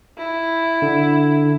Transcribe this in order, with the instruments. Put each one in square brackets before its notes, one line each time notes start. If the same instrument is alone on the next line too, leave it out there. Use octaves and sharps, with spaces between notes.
[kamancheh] E4
[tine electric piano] D3